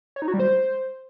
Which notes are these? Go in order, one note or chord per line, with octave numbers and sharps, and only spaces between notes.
C#5
D#4
F#4
G3
C5